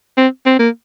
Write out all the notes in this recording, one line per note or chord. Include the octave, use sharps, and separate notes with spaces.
C4
C4
A#3